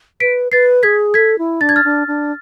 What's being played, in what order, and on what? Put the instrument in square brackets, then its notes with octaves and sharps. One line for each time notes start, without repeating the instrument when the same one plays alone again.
[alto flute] B4 [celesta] B6 D7
[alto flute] B4 [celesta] A6 C7
[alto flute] G#4 [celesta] G#6 B6
[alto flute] A4 [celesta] G#6 B6
[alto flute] E4
[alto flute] D4 [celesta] A6
[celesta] G#6
F6 A6
[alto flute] D4
D4